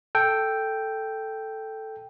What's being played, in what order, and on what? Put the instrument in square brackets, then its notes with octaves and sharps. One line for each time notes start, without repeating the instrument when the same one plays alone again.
[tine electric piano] A4 G5